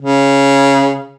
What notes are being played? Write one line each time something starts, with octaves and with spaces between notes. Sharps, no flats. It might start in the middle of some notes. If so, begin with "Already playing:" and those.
C#3